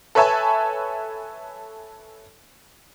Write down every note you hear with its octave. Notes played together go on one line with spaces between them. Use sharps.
A4 B4 C#5 E5 G#5 A5